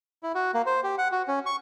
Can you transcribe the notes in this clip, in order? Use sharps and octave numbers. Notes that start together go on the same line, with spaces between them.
E4
F#4
A#3
C5
G4
F#5
F#4
C#4
C#6